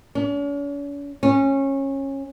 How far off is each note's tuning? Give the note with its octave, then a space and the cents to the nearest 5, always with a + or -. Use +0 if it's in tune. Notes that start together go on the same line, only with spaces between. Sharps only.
C#4 +45
C#4 -20